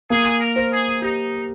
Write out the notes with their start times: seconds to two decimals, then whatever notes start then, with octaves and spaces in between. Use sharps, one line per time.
0.10 A#3 G#4
0.40 A#4
0.56 C5
0.72 G#4
1.02 D#4 G4